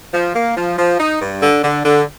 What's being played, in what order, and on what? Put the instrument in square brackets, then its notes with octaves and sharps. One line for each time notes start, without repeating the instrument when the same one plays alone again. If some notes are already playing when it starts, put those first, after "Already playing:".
[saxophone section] F3
A#3
F3
F3
D#4
G2
D3
D3
D3